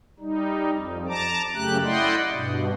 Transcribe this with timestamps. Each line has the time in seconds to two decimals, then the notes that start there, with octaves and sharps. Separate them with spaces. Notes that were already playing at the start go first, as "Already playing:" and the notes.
0.20 G3 D#4
0.73 F2
1.08 A5 A#5 D6
1.54 F#2 C#3 A3 G4 F#6
1.83 E4 D5 D#5 F#5 G5 C6
2.33 G2 B2